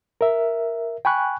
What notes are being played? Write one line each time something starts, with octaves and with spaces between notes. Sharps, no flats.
A#4 E5
G5 G#5 B5 C#6 F#6